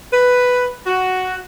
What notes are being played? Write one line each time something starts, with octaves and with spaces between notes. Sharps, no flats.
B4
F#4